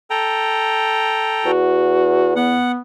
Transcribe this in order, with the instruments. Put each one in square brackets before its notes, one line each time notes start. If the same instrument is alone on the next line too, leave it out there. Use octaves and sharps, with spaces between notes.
[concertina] A4 G5 A#5
[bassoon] E2 [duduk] F#4
[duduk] B3 [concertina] F#5